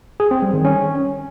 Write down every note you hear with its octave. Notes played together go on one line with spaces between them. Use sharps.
G#4
C4
G3
D#3
C#4